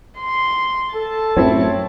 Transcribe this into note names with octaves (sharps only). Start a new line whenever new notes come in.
C6
A4 A5
F#2 A2 C4 E4 C#5